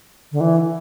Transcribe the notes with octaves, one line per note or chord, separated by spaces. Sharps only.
D3
E3